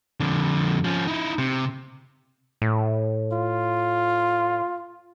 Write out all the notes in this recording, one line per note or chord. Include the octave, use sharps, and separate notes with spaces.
F2 D3
F3 C#4
D#4 E4
C3
A2
F4